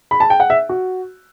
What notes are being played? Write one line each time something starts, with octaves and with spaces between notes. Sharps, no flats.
B5
A5
G5
F#5
E5
F#4